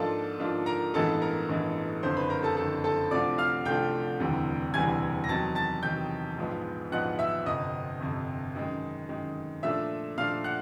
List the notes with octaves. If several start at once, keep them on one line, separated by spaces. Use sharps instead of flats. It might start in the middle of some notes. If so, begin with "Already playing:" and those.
Already playing: G#2 F3 A#3 D4 F4 A4 A5
G#2 F3 A#3 D4 F4
A#4 A#5
A1 G2 E3 G#3 B3 A4 A5
A#4 A#5
A1 G2 E3 G#3 B3
F#1 F2 D3 C5 C6
B4 B5
A#4 A#5
A4 A5
F#1 F2 D3 A4 A5
A4 A5
C2 C3 F3 A3 D4 D5 D6
F5 F6
C2 C3 F3 A3 D4 G5 G6
E1 D2 C3 E3 G3
E1 D2 C3 E3 G3 G#5 G#6
A#6
E2 C3 D#3 F#3 A5 A6
A5 A6
E2 C3 D#3 F#3 G5 G6
A#1 G#2 F3 G#3 B3
A#1 G#2 F3 G#3 B3 F#5 F#6
E5 E6
G1 F2 C3 D#5 D#6
G1 F2 C3
F#2 D#3 G#3
F#2 D#3 G#3
A#2 F3 A3 D4 E5 E6
A#2 F3 A3 D4 F5 F6
F#5 F#6